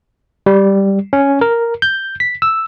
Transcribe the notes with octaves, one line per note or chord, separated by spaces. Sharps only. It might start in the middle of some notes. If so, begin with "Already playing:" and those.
G3
C#4
A#4
G6
B6
E6